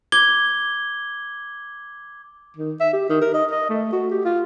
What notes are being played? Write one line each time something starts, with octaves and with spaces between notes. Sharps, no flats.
D6 G#6 G7
D#3
E5
G4
D#3
A#4
D#5
D#5
A3
F#4
G4
F4